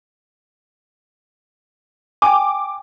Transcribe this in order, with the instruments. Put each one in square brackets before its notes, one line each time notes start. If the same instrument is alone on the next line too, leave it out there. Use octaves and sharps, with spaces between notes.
[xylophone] G5 G#5 [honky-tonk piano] D6